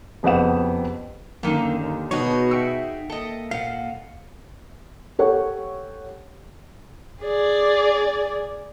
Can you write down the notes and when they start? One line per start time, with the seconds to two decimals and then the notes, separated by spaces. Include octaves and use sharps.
0.23 F#1 F2 B3 G4 F#5 E7
1.43 F#2 D3 D#3 A#3
1.79 D#2
2.11 B2 B3 D#4 F#4 G#4 C#5
2.51 F#4 E5 G5 E6
3.10 A#3 A4 D#5
3.51 A#2 F5 F#5
5.19 G4 A4 C#5 F#5
7.23 G#4 D5